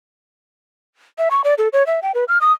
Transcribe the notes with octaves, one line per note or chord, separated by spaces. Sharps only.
E5
C#6
D5
A4
C#5
E5
G5
B4
F6
D#6